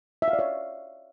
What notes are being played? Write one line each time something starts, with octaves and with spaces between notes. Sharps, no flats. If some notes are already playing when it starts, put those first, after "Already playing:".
E5
F5
D5
C#5